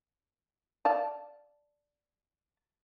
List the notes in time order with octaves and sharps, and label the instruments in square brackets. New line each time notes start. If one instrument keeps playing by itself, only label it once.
[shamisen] D5 F5 A5